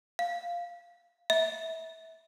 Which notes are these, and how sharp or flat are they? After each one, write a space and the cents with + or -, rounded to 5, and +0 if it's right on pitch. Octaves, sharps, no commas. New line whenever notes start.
F5 -5
E5 -25